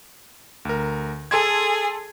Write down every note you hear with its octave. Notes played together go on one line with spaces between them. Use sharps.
D2 A#4
G#4 A4 C6 G#6